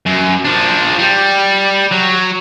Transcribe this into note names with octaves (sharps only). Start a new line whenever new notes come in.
F#2
F3 D4
G3
F#3